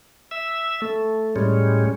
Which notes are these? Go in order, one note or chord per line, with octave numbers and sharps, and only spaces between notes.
E5
A3
A2 G3 G#3 C#4